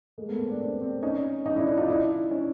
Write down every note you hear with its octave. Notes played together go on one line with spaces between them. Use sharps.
G#3 A#3
A3 B3
A#3 C4
C4 D4
C4 D4
C4 D4
C#4 D#4
C#4 D#4
D4 E4
D4 E4
D#4 F4
D4 E4
C#4 D#4